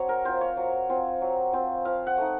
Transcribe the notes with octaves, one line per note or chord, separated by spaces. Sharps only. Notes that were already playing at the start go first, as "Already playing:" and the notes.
Already playing: F#3 C4 C#5
A#4
C4 F4 C5
C#5
F#3
C4 F4
F#3
C4 F4
F3 F5
F#5
A3 D#4